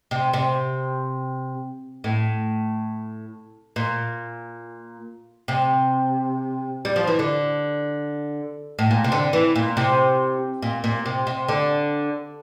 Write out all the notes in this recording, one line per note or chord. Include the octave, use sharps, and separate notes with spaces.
C3
C3
A2
A#2
C3
G3
F3
E3
D3
A2
A#2
C3
D3
E3
A#2
C3
A#2
A#2
C3
C3
D3